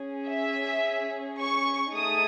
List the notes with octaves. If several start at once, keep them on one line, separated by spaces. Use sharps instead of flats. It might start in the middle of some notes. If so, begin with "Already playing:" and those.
Already playing: C#4 G#4
E5
C#6
A3 D#4 G#4 D#6